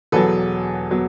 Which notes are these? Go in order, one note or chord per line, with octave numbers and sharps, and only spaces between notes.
E1 E2 B2 F#3 A4 B4
B2 F#3